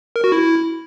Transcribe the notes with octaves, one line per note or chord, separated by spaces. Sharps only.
A#4
F#4
E4